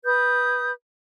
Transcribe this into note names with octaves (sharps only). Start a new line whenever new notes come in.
B4 D#6 G6